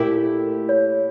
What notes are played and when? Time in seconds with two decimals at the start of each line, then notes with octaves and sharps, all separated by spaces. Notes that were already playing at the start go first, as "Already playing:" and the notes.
Already playing: A#2 A3 E4 G4 A#4
0.69 C#5